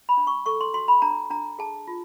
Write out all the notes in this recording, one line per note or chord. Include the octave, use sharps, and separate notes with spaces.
B5
D4
C#6
A4 C#6
C6
F#4 C6
B5
D4 A#5
D4 A#5
G#4 A5
F4